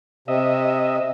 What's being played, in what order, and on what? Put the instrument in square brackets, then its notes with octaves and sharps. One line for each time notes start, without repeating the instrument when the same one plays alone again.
[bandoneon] C3 [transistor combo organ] D#5 E5